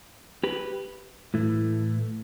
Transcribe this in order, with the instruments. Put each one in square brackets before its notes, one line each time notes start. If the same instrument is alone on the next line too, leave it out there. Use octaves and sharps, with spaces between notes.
[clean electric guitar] G4 B4
A2 E3 A3